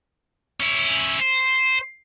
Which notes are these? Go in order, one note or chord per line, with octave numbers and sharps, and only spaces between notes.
C#4 E4
C5